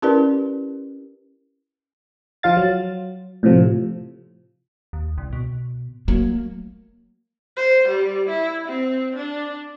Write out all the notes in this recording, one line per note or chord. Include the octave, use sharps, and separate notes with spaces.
C#4 E4 G4 A#4 B4 D5
F3 F4 F5 A6
F#3
A2 C3 F3
D#2
C2
B2
F#3 A3 A#3
C5
G3
E4
C4
D4